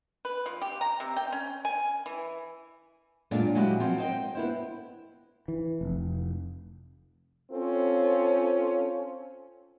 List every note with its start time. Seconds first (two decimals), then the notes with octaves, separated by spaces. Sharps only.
0.25 B4
0.46 F3
0.62 G4
0.81 A#5
1.00 C3
1.17 G5
1.32 C#4
1.65 G#5
2.06 E3
3.31 F#2 A#2 G#3 D4
3.55 F#3 G#3 E4 F#4 G4
3.80 F3 F#3 C4
3.98 C5 D#5 G5
4.35 B3 E4 C5
5.48 E3
5.81 F1
7.51 C4 C#4 F4 A4